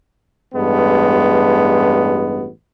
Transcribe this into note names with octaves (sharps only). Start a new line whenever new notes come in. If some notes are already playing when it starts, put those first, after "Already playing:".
A1 G2 G#3 B3